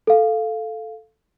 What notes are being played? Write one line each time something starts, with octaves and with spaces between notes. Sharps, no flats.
A4 F5